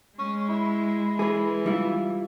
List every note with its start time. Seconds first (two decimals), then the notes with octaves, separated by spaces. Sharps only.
0.18 G#3 C#4
0.48 E4
1.19 E3 G#4 B4
1.66 G3 E4 F4